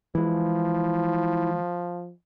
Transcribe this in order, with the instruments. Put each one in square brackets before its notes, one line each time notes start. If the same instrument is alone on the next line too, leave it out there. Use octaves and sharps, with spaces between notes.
[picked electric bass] E3 G#3 [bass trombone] F3 [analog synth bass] E4